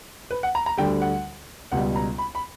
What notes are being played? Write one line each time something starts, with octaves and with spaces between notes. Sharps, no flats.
B4
F#5
A#5
A#5
D2 D3 G3 G5
F#5
C#2 B2 G3 F#5
A#5
B5
B5